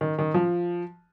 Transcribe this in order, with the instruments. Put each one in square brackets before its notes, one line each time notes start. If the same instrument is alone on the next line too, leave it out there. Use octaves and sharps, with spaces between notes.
[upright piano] D#3
D#3
F3